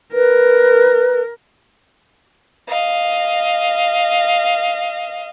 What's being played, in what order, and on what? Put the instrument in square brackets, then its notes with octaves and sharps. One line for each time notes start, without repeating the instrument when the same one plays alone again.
[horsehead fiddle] A#4 [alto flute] B4
[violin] D#5 F5